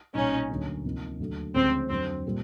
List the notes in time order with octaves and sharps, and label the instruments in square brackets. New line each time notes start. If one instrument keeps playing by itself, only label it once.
[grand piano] B1 A#2 G3 [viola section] C#4 D#4
[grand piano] D2 D3 F#3 A#3 C#4
D2 C3 F3 A#3 D#4
D#2 D3 F#3 A3
[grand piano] D2 C#3 F3 G#3 C#4 [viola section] C4
[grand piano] F2 D3 F#3 [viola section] C4
[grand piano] A#2 G3